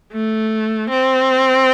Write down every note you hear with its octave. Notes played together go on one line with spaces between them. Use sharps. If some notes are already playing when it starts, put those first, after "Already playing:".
A3
C4